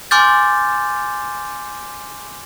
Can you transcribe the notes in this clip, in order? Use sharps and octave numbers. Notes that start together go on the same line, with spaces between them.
G#5 C6 D6 F6 G6 A6